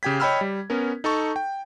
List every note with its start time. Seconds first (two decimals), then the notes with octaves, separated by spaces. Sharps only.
0.03 C#3 G4 G5 G#6 B6
0.20 C#5 D#5 G5 B5 E6 F6
0.41 G3
0.70 B3 C#4 A#4
1.04 D#4 A4 A5 C#6
1.36 G5